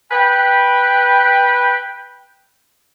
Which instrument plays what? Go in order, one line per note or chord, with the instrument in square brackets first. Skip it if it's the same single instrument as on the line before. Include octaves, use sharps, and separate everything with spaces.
[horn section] B4 G5